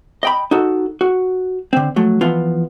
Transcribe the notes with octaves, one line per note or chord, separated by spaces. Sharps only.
D#5 G5 B5
D#4 F#4 A4
F#4
D3 C4
F3 F#3 A3
E3 F3 B3 F4